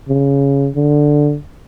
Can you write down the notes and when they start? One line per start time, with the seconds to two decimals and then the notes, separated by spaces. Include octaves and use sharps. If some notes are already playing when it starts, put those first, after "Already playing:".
0.09 C#3
0.76 D3